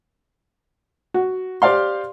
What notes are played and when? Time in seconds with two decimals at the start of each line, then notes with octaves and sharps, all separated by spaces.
1.14 F#4
1.62 G4 C5 D5 F5 C6